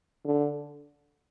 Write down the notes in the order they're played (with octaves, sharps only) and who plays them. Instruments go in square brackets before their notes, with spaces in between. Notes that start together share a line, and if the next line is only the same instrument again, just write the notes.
[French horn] D3